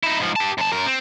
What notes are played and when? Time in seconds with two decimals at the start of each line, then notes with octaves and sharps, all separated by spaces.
0.03 D#4 E4
0.20 G#2 F3
0.36 G4 A5
0.58 F#2 A5
0.72 F#2 A#4
0.86 C4